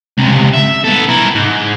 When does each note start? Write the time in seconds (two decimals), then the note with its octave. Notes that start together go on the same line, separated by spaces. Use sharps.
0.18 C#2 C3
0.53 E5
0.84 B3 A4
1.09 E4 A#4
1.35 G#2